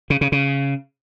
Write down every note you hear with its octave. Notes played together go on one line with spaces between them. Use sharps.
C#3
C#3
C#3